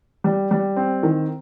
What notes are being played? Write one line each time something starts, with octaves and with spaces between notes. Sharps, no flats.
G3
G3
C4
D#3